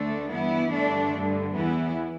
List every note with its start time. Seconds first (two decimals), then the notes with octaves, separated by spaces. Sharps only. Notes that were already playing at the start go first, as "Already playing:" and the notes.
Already playing: D2 D3 A3 D4
0.30 G2 E3 B3 E4
0.71 G2 D3 A3 D4
1.13 G2 D3
1.53 E2 E3 B3 E4